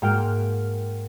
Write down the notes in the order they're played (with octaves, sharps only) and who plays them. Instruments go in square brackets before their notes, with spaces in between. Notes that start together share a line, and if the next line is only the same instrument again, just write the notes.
[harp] G#2 A#3 F#4 G5 F6 D7